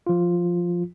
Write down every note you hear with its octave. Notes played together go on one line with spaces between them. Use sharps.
F3 F4